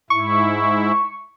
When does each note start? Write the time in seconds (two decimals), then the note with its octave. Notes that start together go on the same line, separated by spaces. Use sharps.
0.10 G#2 E4 C#6